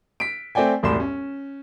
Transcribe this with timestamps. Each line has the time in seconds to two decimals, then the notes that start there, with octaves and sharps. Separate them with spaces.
0.20 B6 D7
0.55 A3 C4 D5 G5 G#5
0.83 E1 C2 A2 D5 C6 E7
1.00 C#4